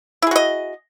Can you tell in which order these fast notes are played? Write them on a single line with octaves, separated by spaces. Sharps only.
E4 G#4 F#4 D#5